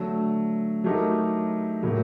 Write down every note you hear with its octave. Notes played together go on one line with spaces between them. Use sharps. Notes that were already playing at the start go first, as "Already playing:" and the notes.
Already playing: D3 F#3 A3
F#3 A3 D#4 G4 A#4
A2 F#3 A#3